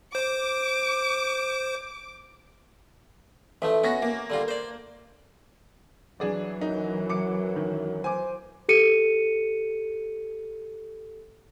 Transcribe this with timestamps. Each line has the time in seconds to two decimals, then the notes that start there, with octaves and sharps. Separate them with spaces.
0.15 C5 D6
3.62 A1 F3 A3 E5
3.84 B3 C#4 F#4 A#6
4.02 A#3
4.30 D3 G3 F4
4.48 C5 D5
6.20 E3 F#3 D4 G#4 D5
6.61 F#2 D#4
7.09 D6 C#7
7.56 D#3
8.04 C5 G#5 D6
8.69 G4 A4 C#7 D#7